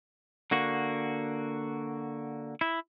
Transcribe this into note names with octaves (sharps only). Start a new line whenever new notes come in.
D3 A#3 F#4
E4